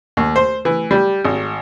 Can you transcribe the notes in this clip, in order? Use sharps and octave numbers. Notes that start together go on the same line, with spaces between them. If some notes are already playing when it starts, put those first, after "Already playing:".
D#2
C5
E3
G3
G#1